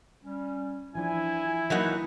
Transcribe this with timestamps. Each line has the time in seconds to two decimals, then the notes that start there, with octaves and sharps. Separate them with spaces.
0.24 G3 C#4
0.95 E3 F3 D4 E4 G#5
1.70 E3 F#3 A#3 D#4 F#4